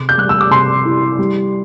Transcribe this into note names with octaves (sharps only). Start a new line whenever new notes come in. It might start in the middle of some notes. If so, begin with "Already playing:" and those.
Already playing: C3 D6
G6
G3 F#6
E6
D6
C3 C6
E4
G3